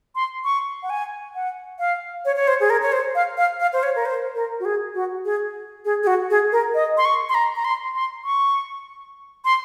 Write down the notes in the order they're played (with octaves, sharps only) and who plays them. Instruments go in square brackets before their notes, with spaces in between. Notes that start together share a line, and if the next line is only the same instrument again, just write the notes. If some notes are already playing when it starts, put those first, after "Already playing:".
[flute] C6
C#6
F#5
G#5
F#5
F5
C#5
C#5
C5
G#4
A#4
C#5
C5
F5
F5
F5
C5
C#5
A#4
C5
A#4
F#4
G#4
F#4
G#4
G#4
G#4
F#4
G#4
A#4
D#5
C6
C#6
C6
A#5
A#5
C6
C6
C#6
C6